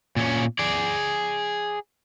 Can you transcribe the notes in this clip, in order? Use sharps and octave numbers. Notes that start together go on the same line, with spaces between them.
A#2 C#4
G#4 D5